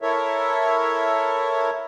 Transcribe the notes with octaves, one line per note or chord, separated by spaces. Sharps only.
E4 A4 A#4 C#5 E5